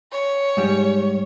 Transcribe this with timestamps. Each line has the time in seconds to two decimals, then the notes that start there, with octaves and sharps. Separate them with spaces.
0.12 C#5
0.57 G#2 G3